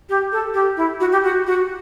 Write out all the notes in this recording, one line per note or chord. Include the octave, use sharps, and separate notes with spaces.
G4
A4
G4
E4
F#4
G4
F#4
F#4